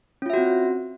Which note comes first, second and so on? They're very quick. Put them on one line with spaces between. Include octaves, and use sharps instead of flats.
C#4 F4 E5 F#4 C4